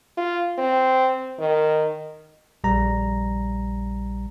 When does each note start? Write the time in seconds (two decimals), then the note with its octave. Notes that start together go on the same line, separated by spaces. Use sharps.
0.17 F4
0.58 C4
1.39 D#3
2.64 A#1 G3 A#5